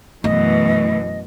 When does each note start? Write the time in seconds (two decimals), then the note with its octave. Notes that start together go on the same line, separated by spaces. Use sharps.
0.24 F#2 B2 E3 A3 D#5